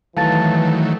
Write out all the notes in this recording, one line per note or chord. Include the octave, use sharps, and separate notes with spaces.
D#3 E3 F#3 A3 F5 A5 A6